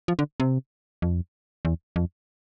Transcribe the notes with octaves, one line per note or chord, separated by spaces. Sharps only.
F3
D3
C3
F2
E2
F2